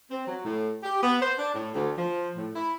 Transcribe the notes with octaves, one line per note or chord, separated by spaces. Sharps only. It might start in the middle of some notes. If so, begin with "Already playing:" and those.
C4
F#3
A2
G4
B3
C5
D4
A2
D2
F3
A2
E4